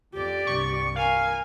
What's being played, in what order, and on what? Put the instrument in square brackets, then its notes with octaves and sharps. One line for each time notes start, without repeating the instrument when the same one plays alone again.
[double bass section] F2 [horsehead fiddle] G4 D5
[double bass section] C2 G2 [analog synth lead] C#6
[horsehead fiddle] A#4 G#5 [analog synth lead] F5